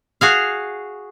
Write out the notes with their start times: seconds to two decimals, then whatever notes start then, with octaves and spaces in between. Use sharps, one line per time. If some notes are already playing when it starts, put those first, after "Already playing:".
0.21 F#4 G#4 F5